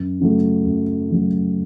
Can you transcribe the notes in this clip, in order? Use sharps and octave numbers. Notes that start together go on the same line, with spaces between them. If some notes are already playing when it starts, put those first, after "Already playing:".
Already playing: F#2
C#3 F#3 A3
F#2
C#3 F#3 A3